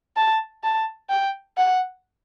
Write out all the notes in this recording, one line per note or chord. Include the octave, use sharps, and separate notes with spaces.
A5
A5
G5
F#5